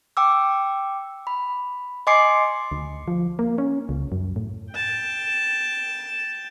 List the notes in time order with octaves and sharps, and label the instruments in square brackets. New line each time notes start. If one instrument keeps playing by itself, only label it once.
[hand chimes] G5 D6 E6
B5
D#5 G#5 C6 D6 C7 C#7
[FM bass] D2
F3
A#3
C#4
C#2
F#2
A2
[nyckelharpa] G5 A5